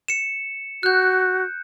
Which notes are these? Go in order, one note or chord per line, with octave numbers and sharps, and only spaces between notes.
C#7 E7
F#4 F#6 G6